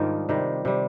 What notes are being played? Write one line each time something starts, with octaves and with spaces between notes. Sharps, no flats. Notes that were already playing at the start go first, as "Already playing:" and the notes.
Already playing: G#2 D#3 G3 D4 F4
C3 D#3 G3
C3 G3